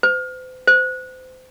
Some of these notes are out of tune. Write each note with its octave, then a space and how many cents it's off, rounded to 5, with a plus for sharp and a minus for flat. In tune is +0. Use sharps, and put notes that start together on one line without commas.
C5 -40
C5 -30